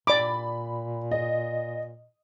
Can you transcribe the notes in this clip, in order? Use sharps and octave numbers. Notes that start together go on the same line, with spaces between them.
A#2 D5 B5 D6
D#5